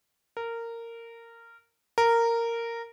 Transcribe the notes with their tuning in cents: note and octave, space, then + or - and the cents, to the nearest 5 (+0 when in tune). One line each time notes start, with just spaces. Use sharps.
A#4 -15
A#4 -10